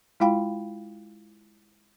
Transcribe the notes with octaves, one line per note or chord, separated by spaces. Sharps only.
G#3 E4 F4 F5 G5 B5